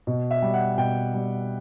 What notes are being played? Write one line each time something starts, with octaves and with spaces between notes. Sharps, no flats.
B2
E5
G3
F#5
B2 G5
G3